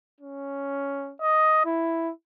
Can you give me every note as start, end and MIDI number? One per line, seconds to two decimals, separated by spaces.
0.21 1.13 61
1.21 1.64 75
1.65 2.11 64